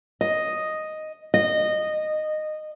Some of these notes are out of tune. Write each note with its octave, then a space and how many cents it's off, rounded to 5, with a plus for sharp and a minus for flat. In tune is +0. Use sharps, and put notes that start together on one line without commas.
D#5 +0
D#5 -15